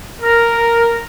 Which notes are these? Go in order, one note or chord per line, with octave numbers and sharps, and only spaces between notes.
A#4